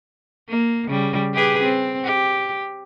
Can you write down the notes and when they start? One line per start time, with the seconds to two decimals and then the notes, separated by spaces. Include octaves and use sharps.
0.49 A#3
0.88 C#3 G3
1.34 G4 G#4 B4
1.63 C4
2.04 G4